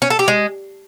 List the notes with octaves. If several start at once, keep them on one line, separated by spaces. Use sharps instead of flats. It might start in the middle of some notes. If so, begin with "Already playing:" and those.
C#4
A4
G4
G#3